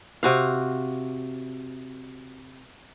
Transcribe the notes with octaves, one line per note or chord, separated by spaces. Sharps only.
C3 F#4 F5